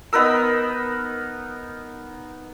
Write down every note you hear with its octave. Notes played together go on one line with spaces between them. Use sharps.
B3 D#4 A#4 E6